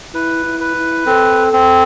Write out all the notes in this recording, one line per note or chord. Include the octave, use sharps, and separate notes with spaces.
E4 B4
E4
B4
E4
C4 A4
C4